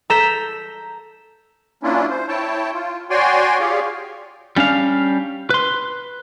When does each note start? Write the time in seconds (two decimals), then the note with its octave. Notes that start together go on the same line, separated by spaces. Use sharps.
0.10 A4 A#5 G6 B6 E7
1.83 F#3 A#3 C#4 D4 E4 F4
2.10 C5
2.28 E4 C#5 G5 A5
2.73 F4
3.10 F#4 C#5 D5 G5 G#5 C6
3.60 F4 G4 G#4 C#5 D5 F5
4.56 G3 C#4 D4 F5
5.50 B4 C6